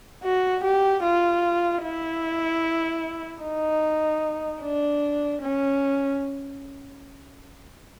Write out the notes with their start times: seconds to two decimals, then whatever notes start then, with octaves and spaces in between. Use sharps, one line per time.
0.23 F#4
0.64 G4
1.03 F4
1.83 E4
3.43 D#4
4.62 D4
5.42 C#4